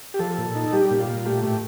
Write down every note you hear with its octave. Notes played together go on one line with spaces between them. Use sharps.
G4
F3 A4
A#2
D#4
G3 G4
A#2
F4
A#2
A3 G4
A2 G4